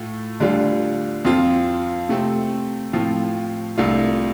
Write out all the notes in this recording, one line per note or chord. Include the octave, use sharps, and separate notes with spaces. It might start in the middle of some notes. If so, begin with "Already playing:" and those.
Already playing: A2 A3 F4
D2 D3 G3 D4 F4
F2 F3 C4 F4
C3 A3 C4
A2 F3 C4 F4
C2 C3 A3 D4 F4